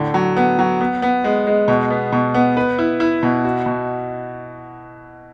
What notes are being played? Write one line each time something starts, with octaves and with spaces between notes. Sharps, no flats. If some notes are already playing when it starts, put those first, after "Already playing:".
Already playing: A2 D3
F#3
B3
F#3
B3
B3
G#3
G#3
B2
B3
B2
B3
B4
E4
E4
B2
F#4
B2